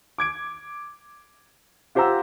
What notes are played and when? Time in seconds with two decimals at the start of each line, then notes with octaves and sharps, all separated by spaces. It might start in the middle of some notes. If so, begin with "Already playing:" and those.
0.18 D6 G#6 D7
1.95 F4 G4 C5 F#5 A#5 E6